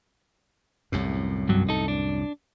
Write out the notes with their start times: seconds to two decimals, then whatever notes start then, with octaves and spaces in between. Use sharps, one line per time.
0.92 C2 F#2 A2
1.49 G2 F#3
1.69 D#4 A4
1.88 D4